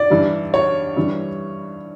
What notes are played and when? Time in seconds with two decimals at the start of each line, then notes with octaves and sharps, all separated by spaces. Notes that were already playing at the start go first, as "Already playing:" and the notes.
Already playing: D5
0.10 G2 E3 G3
0.54 C#5
0.96 G2 E3 G3